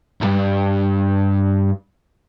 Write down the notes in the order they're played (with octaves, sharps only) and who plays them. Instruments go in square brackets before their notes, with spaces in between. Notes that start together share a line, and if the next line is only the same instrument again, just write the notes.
[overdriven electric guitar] C2 G2